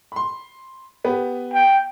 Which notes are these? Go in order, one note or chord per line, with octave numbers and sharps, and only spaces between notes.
B5 C6
B3 G4 B4
G5